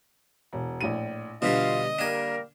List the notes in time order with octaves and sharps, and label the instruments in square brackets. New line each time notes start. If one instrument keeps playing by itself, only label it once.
[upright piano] E1
A#1 A2 D#7
[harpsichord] B2 E3 G3 [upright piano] D3 [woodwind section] F4 F5 [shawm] D#5
[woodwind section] G3 A#3 A#4 [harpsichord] D4 G#5